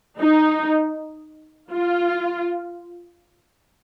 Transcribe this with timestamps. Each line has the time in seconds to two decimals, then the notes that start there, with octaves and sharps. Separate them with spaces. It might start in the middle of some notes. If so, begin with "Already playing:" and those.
0.22 D#4
1.72 F4